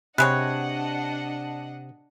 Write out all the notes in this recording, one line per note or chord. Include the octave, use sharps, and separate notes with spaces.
C3 G3 G#3 D4 C#5 D#5 F#5 F#6